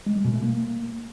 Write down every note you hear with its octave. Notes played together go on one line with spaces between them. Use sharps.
G#3
G3
B2
A3
A#3